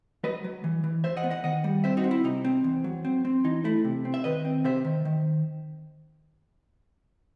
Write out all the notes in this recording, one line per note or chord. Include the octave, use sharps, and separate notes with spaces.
F#3 B4 D#5
F#3
E3
E3
E3 C5 E5
D#5 F#5
B3
D#5 F#5
D#3 D#5 F#5
G3
C4 C5 E5
D#4 F#4
C4
E4
C3 D#4
C4
E2
F#3
C4
C4
E3 D#4
A3 E4
C3
C4
E5
D#3 B4 D#5
C4
C3 C5 E5
D#3
D#3